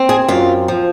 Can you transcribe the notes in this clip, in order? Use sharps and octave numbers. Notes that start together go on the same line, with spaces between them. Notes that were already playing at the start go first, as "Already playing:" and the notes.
Already playing: C4
G#4
F#2 F4
F3